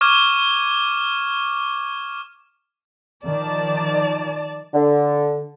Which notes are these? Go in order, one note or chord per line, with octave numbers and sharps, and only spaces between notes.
C#6 D6 F6 G#6 E7
D#3 F3 D5 A5
D3